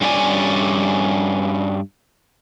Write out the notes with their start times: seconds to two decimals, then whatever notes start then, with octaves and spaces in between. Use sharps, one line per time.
0.01 G2 C#4 G4 D5 G#5